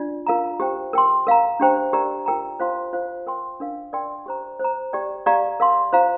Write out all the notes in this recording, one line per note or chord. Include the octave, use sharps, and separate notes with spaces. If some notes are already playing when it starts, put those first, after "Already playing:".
Already playing: D4 F4 D5
F4 A#4 F5 A#5
G4 C5 G5
A#4 G5 C6
A#4 F5 A#5
D4 G4 C5 G5 A#5
G4 A#4 D5 A#5
F4 A#4 G5 A#5
F4 C5 F5 C6
F4 C5 F5
A#4 G5 C6
D4 A#4 F5
A#4 D5 G5 C6
G4 C5 A#5
C5 A#5
G4 D5 G5
G4 D5 F5 A#5
A#4 F5 C6
F4 C5 F5 A#5